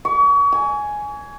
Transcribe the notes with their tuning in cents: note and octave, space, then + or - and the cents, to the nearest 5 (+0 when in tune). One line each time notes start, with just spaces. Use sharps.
C#6 +35
G#5 +5